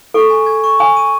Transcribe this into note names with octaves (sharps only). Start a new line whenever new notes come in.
A4 C#6
G#5
G#6
C#6
G#5 D#6
D#7